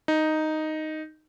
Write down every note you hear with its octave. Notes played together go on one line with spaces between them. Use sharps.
D#4